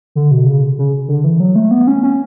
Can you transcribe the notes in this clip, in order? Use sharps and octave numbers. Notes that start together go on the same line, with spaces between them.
D3
B2
C#3
C#3
D3
E3
F#3
A3
B3
C#4
C#4